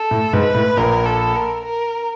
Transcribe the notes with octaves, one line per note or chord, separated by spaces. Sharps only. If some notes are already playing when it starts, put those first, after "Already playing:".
Already playing: A4
A2
G#2 B4
A2
A#1 A#2 A#4
A4
A#4
A#4